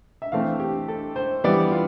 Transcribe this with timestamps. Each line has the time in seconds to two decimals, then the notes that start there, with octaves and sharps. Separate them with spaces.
0.22 E5
0.32 E3 A3 C4 F5
0.60 G4
0.88 A4
1.16 C5
1.44 E3 G3 B3 D5
1.72 F4